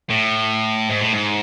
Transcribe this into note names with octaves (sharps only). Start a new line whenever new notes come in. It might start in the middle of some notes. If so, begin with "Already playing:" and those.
A2
G#2
A2
G#2